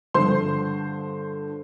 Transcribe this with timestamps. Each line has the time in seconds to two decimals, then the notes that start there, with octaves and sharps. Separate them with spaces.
0.14 G2 D3 F3 C5 C6